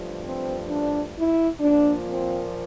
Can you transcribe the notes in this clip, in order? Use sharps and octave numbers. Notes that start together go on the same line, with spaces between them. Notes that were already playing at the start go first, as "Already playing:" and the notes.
Already playing: G2 F3 A3
C4
D4
E4
A#2 F3 A#3 D4
C4